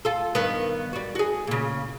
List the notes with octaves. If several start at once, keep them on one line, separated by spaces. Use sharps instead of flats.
F4 A4
G2 D#3 B3
G3 F#4
F#4 G#4
A#2 C#3